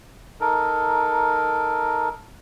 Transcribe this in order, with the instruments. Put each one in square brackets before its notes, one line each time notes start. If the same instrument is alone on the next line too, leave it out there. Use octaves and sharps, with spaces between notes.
[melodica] D#4 A4 A#4